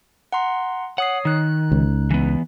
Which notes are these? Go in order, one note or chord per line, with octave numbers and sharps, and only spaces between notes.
F#5 A#5 C6
C#5 F#5 D#6 C7
D#3 D#4 F#6
C#2
E3 B3